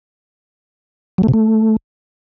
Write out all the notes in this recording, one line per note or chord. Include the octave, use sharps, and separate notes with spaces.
F#3
A3
C3
A3